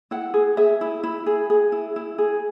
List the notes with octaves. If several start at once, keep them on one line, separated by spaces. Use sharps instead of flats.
E4 F#5
G#4
G#4 E5
E4
E4
G#4
G#4
E4
E4
G#4